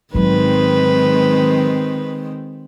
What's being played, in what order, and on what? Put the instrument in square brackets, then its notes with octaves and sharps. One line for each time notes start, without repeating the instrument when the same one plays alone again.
[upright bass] G#2 F#3 [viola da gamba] D#3 G#3 C4 [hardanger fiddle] B4